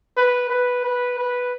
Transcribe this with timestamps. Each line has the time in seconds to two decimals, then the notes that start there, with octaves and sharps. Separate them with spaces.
0.17 B4
0.50 B4
0.84 B4
1.19 B4